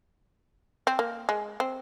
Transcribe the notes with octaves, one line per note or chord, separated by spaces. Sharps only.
C4
A#3
G#3
C4